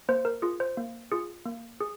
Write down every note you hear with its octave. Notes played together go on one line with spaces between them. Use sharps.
A#3 C5
A#4
F4 G#4
C5
A#3
F4 G#4
A#3
G#4